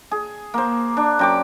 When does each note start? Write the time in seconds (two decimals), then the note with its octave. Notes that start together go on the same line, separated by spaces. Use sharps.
0.11 G#4
0.54 A#3 C5
0.97 D4
1.19 F#2 G5 D6